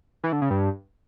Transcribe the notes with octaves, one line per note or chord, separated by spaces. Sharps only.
E3
D3
C#3
G2